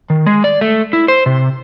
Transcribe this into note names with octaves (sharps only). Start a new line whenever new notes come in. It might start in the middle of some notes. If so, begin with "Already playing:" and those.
D#3
G#3
D5
A3
E4
C5
C3